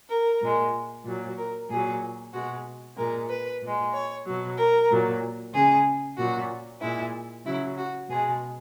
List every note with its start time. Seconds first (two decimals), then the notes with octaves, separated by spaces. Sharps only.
0.10 A#4
0.42 A#2 G#3
1.05 A#2 F#3
1.38 A#4
1.69 A#2 F#3 G#4
2.33 B2 G#3 F#4
2.97 A#2 G#3 A#4
3.29 B4
3.62 A#2 G#3
3.93 C#5
4.26 B2 F#3
4.58 A#4
4.90 A#2 F#3
5.53 C#3 G#3 G#4
6.18 A#2 F#3 F#4
6.81 A#2 G#3 E4
7.46 C#3 F#3 E4
7.77 F#4
8.09 B2 G#3 G#4